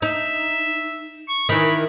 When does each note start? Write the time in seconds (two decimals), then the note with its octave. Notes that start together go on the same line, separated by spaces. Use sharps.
0.02 D#4 E5
1.28 C#6
1.49 D#3 E3 B5